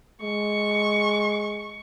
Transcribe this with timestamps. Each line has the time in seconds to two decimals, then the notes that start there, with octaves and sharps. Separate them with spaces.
0.22 G#3 C#6